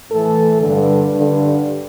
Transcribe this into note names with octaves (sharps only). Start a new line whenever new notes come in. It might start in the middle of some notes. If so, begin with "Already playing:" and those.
A2 E3 A4
G2 D3
G2 D3